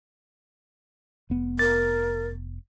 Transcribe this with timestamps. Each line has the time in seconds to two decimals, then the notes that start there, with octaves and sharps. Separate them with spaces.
1.30 F1 B3
1.59 A#4 A6